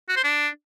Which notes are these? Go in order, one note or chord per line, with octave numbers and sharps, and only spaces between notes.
F#4
C5
D4